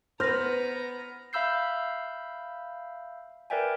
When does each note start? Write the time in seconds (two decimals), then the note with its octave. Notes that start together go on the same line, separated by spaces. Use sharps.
0.20 B3 B4 C5 A#5 F6 G6 A#6
1.33 E5 F5 B5 E6 G6 C7
3.50 A#4 B4 D5 E5 G5 G#5